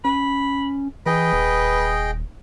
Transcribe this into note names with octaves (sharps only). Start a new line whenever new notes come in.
C#4 B5
E3 G#4 B4 D#5 G5
D#1